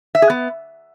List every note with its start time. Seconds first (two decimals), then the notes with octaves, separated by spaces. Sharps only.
0.15 E5
0.22 G#4
0.30 B3